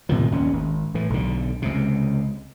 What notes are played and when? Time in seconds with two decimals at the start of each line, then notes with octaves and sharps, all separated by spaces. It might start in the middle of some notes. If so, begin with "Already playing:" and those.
0.09 A2 C3 D#3 F3
0.32 D#2 C#4
0.53 G#1
0.94 A2 E3
1.10 B1 D3
1.62 C#2 C3